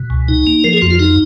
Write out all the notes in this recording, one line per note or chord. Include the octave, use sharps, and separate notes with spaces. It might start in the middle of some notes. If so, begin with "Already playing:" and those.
Already playing: B2
C#2
D#4
A#3
F3 A#4
G#4
F2 F#4
F4
D#4 F#4